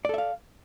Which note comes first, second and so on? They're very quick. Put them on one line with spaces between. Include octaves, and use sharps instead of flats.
D5 A4 E5 F5